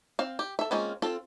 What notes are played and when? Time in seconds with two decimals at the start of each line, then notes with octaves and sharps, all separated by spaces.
0.19 C4 F5
0.39 G4
0.59 A4 E5
0.71 G#3 A#3 C4 C#4 F4
1.02 C4 F4 A4